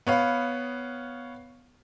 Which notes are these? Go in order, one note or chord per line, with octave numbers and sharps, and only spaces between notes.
B3 C#5 F5